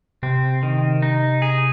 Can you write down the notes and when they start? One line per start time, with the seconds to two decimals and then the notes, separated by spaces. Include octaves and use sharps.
0.23 C3 C4
0.63 D#3
1.02 D#4
1.42 G#4